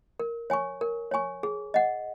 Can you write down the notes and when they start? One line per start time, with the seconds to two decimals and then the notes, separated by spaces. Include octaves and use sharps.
0.20 A#4
0.50 C#5 G#5 C#6
0.81 A#4
1.11 C#5 G#5 C#6
1.43 G#4
1.74 D#5 F#5